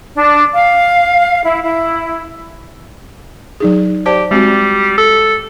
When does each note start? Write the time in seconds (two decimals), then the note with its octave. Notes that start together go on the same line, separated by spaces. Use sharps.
0.16 D4
0.54 F5
1.42 E4
1.63 E4
3.60 F#3 D#4 G#4
4.06 G4 C5 D5 A5
4.31 G3 G#3 C4 F#4
4.98 A4